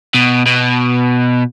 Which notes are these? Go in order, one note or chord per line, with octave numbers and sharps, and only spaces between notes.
B2
B2